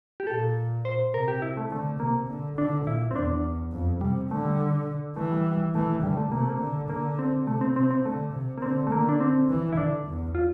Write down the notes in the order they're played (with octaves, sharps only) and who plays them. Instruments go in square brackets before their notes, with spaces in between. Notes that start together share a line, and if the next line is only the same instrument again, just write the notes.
[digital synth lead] G4
[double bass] A#2 [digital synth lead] A4
[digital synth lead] C5
[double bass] C3 [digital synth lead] A#4
[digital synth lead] G4
E4
A3
[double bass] D3 [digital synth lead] A3
[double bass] C3 [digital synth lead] A#3
[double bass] D3
[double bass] D3 [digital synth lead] D4
[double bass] A#2 [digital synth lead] E4
[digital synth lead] C4
[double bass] E2 [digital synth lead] D4
[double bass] F2
[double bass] C3 [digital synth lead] G3
[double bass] D3 [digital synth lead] A3
[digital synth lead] G3
[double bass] E3 [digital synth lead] A3
[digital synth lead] G3
G3
[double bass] E3 [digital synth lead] A3
[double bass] D3 [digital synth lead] G3
[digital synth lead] A3
[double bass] C3 [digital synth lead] A#3
[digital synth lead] A3
A#3
[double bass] D3
[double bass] D3 [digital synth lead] A#3
[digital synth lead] C4
[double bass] C3 [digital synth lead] A3
[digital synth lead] C4
[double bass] C3 [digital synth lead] C4
[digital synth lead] C4
[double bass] D3 [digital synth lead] A3
[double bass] C3
[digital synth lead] A#3
[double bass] D3 [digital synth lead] C4
[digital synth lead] A3
[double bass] D3 [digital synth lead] A#3
[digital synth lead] D4
C4
[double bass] E3
[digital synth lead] E4
[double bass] D3 [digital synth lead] D4
[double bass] E2
[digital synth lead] F4